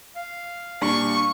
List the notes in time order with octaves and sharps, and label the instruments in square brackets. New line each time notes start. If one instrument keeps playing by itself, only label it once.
[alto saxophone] F5
[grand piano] A#2 G3 D4 [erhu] C#6